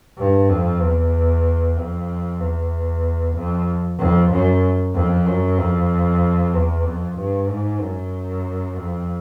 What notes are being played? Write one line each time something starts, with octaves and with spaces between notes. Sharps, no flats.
G2
F2
E2
F2
E2
F2
F2
F#2
F2
F#2
F2
E2
F2
G2
G#2
F#2
F2